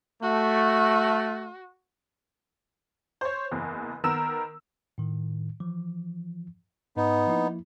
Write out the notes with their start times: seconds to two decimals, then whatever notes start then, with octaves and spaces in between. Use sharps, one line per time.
0.23 A3 F#4
3.21 C5 C#5
3.52 F#1 E2
4.04 D#3 B3 A#4 E6 E7
4.98 A2 D#3
5.60 E3 F3
6.96 G#2 B3 D#4
7.27 F3 A#3 E4